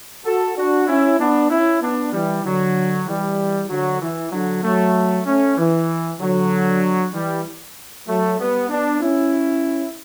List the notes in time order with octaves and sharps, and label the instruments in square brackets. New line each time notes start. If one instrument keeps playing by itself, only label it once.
[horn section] F#4 A4
D4 F#4
C#4 E4
B3 D4
C#4 E4
B3 D4
E3 G3
D3 F#3
E3 G3
D3 F#3
E3
D3 F#3
F#3 A3
A3 C#4
E3
D3 F#3
E3 G3
F#3 A3
G3 B3
B3 D4
C#4 E4